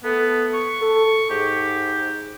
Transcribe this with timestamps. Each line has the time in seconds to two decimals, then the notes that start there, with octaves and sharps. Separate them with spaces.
0.04 A3 B3 A4
0.54 C#6
0.81 A4
1.30 G#2 G4